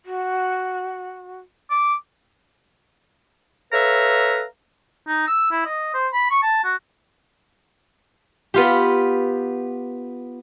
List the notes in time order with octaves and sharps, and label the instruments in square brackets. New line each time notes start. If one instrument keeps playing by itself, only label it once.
[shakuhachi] F#4
[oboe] D6
[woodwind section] A4 B4 C#5 E5 F5 A#5
[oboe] D#4
E6
E4
D#5
C5
B5
C#6
A5
F#4
[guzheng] B3 F4 G4